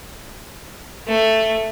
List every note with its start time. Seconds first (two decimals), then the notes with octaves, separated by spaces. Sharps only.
1.08 A3